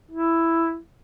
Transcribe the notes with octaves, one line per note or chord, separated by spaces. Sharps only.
E4